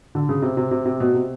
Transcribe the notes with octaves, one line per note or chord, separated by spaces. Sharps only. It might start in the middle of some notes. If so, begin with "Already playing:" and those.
D3
C#3
C3
C3
C3
C3
B2
C3